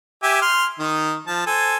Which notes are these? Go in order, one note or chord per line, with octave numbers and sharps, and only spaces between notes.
G4 E5 G#5
C6 F6
D#3 D#4
F3 A5
A4 C5 G#5